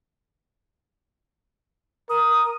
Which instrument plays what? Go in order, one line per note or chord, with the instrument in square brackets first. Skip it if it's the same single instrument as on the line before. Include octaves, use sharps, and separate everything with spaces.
[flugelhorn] A#4 [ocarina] D#6